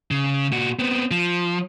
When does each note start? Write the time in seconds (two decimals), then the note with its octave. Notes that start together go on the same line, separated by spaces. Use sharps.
0.11 C#3
0.52 A#2 F#4
0.79 B3 C4
1.11 F3